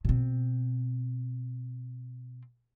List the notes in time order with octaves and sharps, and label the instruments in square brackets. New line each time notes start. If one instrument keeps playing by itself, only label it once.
[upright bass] B2 C4